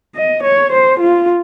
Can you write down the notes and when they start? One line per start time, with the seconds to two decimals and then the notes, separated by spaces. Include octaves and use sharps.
0.16 D#5
0.44 C#5
0.72 C5
1.00 F4